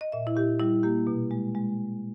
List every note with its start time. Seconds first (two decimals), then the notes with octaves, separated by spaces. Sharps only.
0.01 D#5
0.12 A#2 E5
0.27 E4
0.36 A#2 G4
0.59 G3 E4
0.83 A#3 G4
1.07 B2
1.31 G#3
1.55 G#3